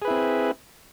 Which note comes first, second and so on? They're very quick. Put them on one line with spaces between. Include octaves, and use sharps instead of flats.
G#4 B4 E4 C4